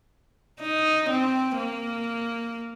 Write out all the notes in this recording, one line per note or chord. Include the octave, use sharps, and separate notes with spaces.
D#4
C4
A#3